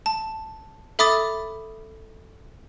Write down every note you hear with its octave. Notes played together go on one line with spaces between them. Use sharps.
A5
A4 E5 B5 D6 D#6 A6